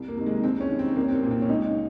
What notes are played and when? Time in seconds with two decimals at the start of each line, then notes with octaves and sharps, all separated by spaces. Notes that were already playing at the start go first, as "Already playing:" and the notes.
Already playing: C2
0.08 A#3
0.17 C3 D#3
0.26 G#3
0.44 C2 C4
0.61 C#4
0.69 C3 D#3
0.79 C4
0.96 C2 A#3
1.09 C4
1.15 A#3
1.23 A#2
1.31 C4
1.42 C#4
1.49 C#2 D#4